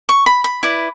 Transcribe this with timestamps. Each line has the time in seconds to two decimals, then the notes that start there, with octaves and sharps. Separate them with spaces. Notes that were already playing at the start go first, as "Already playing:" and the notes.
0.09 C#6
0.26 B5
0.44 B5
0.63 E4 B4 D5